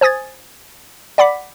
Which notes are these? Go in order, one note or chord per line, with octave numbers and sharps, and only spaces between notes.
C5 G#5 D#6 G#6 A6
D5 F#5 B5 D6 B6